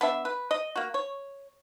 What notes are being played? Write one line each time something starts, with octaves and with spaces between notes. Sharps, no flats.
B3 D4 E5
B4
D#5
A#3 F#4
C#5